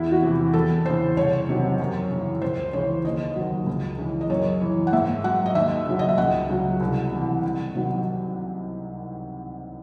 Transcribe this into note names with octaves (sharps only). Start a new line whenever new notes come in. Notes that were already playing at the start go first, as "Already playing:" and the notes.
Already playing: E2 E4
F#4
C3 E3
E2 A4
C#3 E3 C5
C2 C#5
C3 D#3 F#3
F#2
C#3 E3
C#2 C5
C#3 E3 C#5
D#2 D#5
D#3 F#3
C#2
C#3 E3
D#5
F#2 C#5
E3
F#5
G#2 E5
F#3 F#5
D#5
D#2 E5
C#3 F#3
D#5
E5
C#2 F#5
C#3 F#3
C2
C3 E3
C2
C3 D#3 F#3